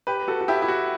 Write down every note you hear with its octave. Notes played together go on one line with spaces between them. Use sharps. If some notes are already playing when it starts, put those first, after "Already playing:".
G4 B4
F#4 A4
F#4
E4 G4
E4
F#4